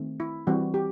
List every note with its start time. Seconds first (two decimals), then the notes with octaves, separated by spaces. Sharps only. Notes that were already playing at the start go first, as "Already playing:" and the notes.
Already playing: D#3 A3 C4
0.20 E4
0.47 E3 G3 C4 F#4
0.74 G4